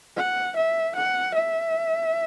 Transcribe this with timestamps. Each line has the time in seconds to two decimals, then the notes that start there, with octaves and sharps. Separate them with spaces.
0.17 F#5
0.57 E5
0.96 F#5
1.35 E5